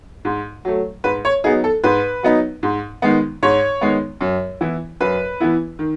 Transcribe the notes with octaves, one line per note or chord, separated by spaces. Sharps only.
G#2
F#3 A3
G#2 B4
C#5
F#3 B3 D#4 G#4
A4
G#2 B4
F#3 B3 D#4
G#2
D#3 G#3 B3
G#2 C#5
D#3 G#3 B3
F#2
E3 B3 E4
F#2 B4
E3 B3 E4
D#3